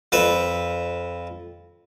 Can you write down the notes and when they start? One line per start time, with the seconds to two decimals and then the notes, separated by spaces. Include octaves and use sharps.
0.12 F2 B4 E5